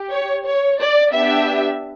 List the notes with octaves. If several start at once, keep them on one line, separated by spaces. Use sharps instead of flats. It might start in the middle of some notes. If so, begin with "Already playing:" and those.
Already playing: G4
C#5
C#5
D5
B3 D4 G4 E5